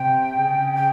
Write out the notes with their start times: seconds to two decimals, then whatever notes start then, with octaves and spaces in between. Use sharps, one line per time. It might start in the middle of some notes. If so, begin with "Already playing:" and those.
Already playing: C3 G5
0.36 C#3
0.76 G5